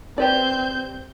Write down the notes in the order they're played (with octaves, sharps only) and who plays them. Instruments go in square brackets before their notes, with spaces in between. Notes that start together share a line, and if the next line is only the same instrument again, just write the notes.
[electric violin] C4 G6 [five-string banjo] G4 B4 D5